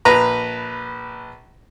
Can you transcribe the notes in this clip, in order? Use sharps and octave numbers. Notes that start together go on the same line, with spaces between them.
A#1 B4 A#5